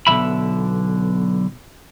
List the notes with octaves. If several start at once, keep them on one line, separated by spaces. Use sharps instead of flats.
B1 B2 D3 E3 E5 B5